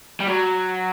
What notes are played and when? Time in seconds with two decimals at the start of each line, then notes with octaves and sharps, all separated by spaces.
0.20 G3
0.28 F#3